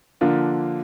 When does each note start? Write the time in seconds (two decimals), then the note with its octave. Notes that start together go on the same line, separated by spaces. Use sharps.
0.21 D3 F3 A#3 D4 F4